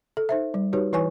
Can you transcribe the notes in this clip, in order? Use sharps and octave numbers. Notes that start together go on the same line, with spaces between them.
A4
D#4 C5 E5
G3
D#4 F#4 G4 B4 C#5
E3 E4 B4 C#5 G#5 C#6